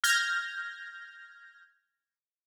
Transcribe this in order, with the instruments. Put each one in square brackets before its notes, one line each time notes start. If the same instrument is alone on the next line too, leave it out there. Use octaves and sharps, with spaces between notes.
[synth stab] F6 G6 G#6 A#6